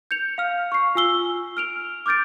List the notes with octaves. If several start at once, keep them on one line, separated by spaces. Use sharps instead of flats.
G6 C#7 F7
F5 F6
C#6 C7
F4 G#5 E6 G7
F6 D7 F7
D6 F6 G6 A6 D7